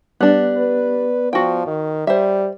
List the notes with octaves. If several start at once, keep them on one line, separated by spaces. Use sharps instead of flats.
G3 B3 D4 D5 F#6
B4
F3 F#4 G5
D#3
G3 C5 E5